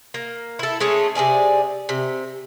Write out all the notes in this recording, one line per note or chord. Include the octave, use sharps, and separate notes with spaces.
A#3
E4 A4
G#3 A3 C#4
C3 D#3 G#4 D5
C3